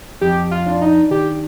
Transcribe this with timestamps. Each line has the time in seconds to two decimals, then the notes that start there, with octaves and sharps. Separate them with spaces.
0.21 F2 G4
0.51 F4
0.66 D4
0.81 D#4
1.11 D#3 G4